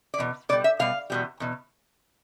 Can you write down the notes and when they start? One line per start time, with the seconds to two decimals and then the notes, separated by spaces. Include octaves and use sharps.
0.14 D5
0.18 E2 B2
0.49 B2 D5
0.52 G3
0.64 E5
0.79 B2 G3 F5
1.10 E2 B2 G3
1.40 E2 B2